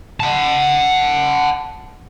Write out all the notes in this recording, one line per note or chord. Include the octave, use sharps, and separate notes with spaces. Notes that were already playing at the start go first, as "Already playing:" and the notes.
F#5 A5